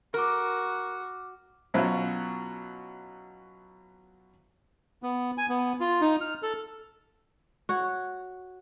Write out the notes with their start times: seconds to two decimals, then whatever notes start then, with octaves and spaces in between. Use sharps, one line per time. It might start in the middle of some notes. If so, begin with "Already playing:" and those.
0.14 F#4 A#4 D6 F6
1.74 B2 F#3 C#4 E4 F4
5.03 B3
5.38 G#5
5.49 B3
5.80 F4
6.01 D#4
6.21 F6
6.43 A4
7.69 F#4 C#5